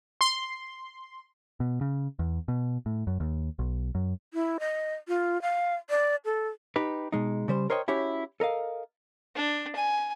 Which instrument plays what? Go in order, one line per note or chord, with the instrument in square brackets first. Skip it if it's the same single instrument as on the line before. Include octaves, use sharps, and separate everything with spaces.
[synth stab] C6
[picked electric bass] B2
C#3
E2
B2
A2
F#2
D#2
B1
F#2
[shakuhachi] E4
D#5
F4
F5
D5
A4
[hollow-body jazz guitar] D#4 G4 B4
B2 G#3 D#4
C#3 G3 C5
A#4 C5 C#5 D#5 G5
C#4 E4 F#4 G4 C#5
A4 A#4 D#5 F5
[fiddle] D4
G#5